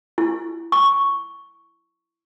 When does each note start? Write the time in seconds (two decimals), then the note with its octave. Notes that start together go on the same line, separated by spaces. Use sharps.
0.18 E4
0.72 C#6